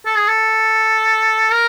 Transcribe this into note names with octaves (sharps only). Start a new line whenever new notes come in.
A4
G#4
A4
A#4